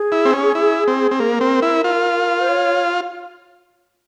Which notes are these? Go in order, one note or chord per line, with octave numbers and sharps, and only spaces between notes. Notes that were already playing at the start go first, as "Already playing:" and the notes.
Already playing: G#4
E4
C4
C#4
E4
C4
C4
A#3 A#4
C4
E4
F4
C5
C#5